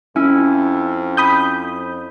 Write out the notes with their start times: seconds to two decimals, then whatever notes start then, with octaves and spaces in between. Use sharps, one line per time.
0.16 F2 C#4 E4
1.17 B5 D#6 G6